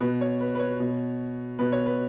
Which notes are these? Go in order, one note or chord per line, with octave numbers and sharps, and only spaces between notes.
B2 B4
C#5
B4
B4
C#5
B2
B2 B4
C#5
B4